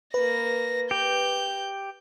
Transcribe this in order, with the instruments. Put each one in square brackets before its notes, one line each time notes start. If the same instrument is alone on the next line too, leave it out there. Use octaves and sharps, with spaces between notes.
[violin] A#3 A#6 [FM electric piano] B4
[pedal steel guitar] G4 [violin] G6